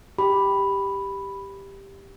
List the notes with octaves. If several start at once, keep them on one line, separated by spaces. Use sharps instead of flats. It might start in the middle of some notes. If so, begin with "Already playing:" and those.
G4 B5